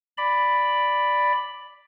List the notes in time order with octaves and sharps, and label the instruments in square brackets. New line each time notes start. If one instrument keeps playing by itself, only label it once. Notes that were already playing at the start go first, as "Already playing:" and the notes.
[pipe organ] D5 B5